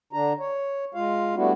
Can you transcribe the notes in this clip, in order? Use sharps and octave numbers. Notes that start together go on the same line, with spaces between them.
D3 D4 A#5
C#5
G#3 F4 F5
G3 A3 B3 D4 E4 F#4